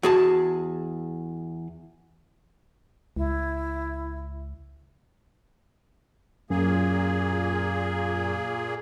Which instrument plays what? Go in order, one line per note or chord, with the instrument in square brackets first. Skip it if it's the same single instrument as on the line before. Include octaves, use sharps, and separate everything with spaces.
[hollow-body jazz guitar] E2 G#4 A5 [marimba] F#4
[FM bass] C#2 [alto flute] E4
[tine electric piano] F#2 [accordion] A#2 A#3 G#4